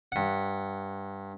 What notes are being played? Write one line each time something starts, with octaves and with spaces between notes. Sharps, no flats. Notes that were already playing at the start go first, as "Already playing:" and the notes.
G2 F#5